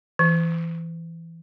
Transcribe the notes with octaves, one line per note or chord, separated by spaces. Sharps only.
E3